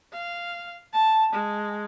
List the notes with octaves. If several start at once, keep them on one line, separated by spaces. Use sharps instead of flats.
F5
A5
G#3